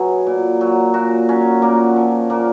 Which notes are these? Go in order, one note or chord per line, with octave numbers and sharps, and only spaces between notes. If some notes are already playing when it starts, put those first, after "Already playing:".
Already playing: B2 F#3 G#4
A#2
F#3
A#2 F#4
F#3 C#4
A#2 A#3
F3
A#2 A#3